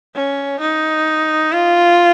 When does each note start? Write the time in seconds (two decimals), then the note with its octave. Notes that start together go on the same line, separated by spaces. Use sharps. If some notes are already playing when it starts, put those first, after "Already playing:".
0.15 C#4
0.60 D#4
1.52 F4